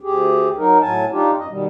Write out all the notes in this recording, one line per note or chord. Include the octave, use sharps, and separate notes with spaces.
D2 G4 G#4
F#3 D#4 A#4
A2 F#3 G#5 A5
D4 D#4 F4 G4
F#2 D#5
B2 D#3 G3